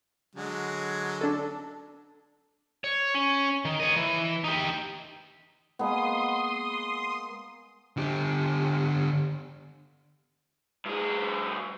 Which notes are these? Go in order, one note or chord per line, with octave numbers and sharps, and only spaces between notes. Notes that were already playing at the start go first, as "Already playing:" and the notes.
D3 F#3 G#3
D4 A4
C#5
C#4
D#3
C#5 D#5
E3
D#4 G4
G#3 A#3 B3 C6 D#6
D3 G4
G2 G#4